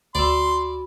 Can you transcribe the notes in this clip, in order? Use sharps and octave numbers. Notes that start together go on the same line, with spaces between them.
D2 F#4 D5 B5 C6 E6